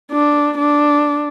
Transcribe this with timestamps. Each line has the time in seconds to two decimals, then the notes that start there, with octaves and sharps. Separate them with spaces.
0.12 D4
0.58 D4